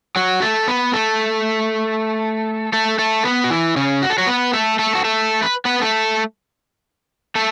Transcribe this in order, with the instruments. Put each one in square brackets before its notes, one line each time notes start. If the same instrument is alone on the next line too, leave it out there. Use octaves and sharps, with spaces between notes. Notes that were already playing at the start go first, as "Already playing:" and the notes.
[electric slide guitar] F#3 F#4
A3 A4
B3 B4
A3 A4
A3 A4
A3 A4
B3 B4
F#4
E3 E4
C#3 C#4
F#4
A4
F#3 F#4
B3 B4
A3 A4
A3 A4
F#4
A3 A4
B4
B3 B4
A3 A4
A3 A4